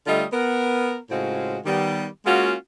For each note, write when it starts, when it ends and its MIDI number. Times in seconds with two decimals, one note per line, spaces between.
0.07 0.25 50
0.07 0.25 55
0.07 0.25 57
0.07 0.25 65
0.07 0.25 75
0.32 0.98 59
0.32 0.98 70
1.10 1.58 45
1.10 1.58 49
1.10 1.58 56
1.10 1.58 60
1.10 1.58 65
1.10 1.58 66
1.66 2.06 51
1.66 2.06 55
1.66 2.06 59
2.26 2.54 56
2.26 2.54 58
2.26 2.54 61
2.26 2.54 65
2.26 2.54 66